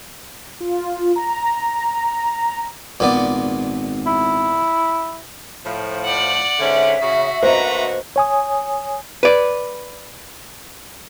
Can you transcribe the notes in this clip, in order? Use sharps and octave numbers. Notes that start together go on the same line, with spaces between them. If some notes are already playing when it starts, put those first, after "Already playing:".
F4
A#5
G#1 A#2 B3 D5
E4
A2 F3
D5 F#5
G#2 D3 C#4 E5
C#3 F#4
D2 A#3 F#4 B4 C5 D#5 A#5
C#5 G#5 D#6
B4 D5